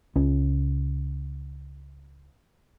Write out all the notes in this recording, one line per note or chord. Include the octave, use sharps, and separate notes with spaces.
C#2 C#4